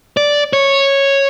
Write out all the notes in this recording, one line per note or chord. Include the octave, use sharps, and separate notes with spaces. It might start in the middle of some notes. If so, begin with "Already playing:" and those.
D5
C#5